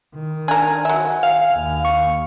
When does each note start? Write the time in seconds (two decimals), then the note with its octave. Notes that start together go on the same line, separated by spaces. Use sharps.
0.15 D#3
0.48 D4 A#4 G#5
0.85 F#3 E5
1.23 F5
1.53 D#2
1.85 C#6